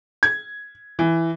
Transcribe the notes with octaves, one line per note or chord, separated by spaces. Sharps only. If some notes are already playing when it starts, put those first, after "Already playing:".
G#6
E3